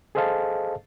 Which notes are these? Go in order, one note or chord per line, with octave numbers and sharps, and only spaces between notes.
G#4 A4 C5 D#5 F5 A5